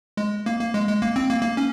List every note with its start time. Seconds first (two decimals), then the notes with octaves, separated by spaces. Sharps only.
0.17 G#3
0.46 A#3
0.60 A#3
0.74 G#3
0.88 G#3
1.02 A#3
1.16 C4
1.29 A#3
1.43 A#3
1.57 C#4